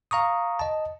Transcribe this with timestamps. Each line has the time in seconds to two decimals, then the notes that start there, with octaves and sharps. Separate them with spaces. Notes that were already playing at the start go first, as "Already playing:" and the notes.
0.11 F5 A#5 C#6 D#6
0.59 D#5 A5